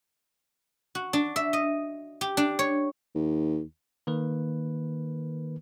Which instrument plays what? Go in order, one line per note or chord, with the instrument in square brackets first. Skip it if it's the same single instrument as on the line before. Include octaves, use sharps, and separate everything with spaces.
[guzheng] F#4
D4
E5
D#5
G4
D4
C#5
[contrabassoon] D#2
[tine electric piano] D#3 A#3 B4